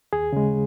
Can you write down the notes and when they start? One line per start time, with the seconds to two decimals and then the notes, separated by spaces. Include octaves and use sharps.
0.13 D#2 G#4
0.33 C#3 G#3